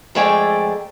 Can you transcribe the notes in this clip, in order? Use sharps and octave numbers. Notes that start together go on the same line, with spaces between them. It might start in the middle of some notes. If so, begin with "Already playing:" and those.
F2 G#3 A3 G#4 D5 G5